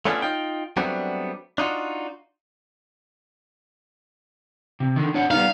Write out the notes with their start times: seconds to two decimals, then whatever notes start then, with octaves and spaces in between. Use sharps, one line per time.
0.05 A3 B3 C#4 D4 E4 F4
0.22 D#4 F4 G5
0.77 F#3 G3 A3 B3 C4 D4
1.58 D4 D#4 F4 F#4
4.80 C3
4.96 D3 D#3
5.14 D4 C#5 F#5
5.31 G3 B3 D#4 F5